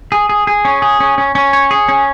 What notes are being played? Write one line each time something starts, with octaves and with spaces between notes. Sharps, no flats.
G#4
G#4
G#4
C#4
G#4
C#4
C#4
C#4
C#5
G#4
C#4